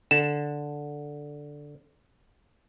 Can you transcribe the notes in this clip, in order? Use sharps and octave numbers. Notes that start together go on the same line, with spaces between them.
D3 E7